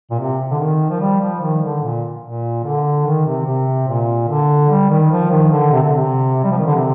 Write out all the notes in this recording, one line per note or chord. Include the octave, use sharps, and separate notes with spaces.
A#2
C3
D3
D#3
F3
G3
F3
D#3
D3
A#2
A#2
D3
D#3
C3
C3
A#2
D3
G3
D#3
F3
D#3
D3
C3
D3
C3
G3
F3
D#3
D3
C3